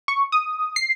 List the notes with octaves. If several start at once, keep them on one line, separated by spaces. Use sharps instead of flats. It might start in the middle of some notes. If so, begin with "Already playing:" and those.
C#6
D#6
C7